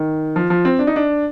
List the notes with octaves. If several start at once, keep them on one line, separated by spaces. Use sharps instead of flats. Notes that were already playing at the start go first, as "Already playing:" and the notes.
Already playing: D#3
F3
F3
C4
D4
D#4
D4